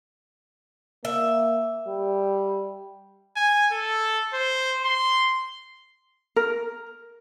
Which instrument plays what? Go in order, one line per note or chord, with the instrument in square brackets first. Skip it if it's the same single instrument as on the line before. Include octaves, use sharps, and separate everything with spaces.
[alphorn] A#3 [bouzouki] E5
[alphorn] G3
[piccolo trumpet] G#5
A4
C5
C6
[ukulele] A#4